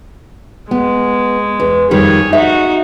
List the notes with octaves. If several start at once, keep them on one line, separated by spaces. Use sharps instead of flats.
G#3 B3
E2
F2 D#3 G3 G#4 C#5
D#4 F#4 E5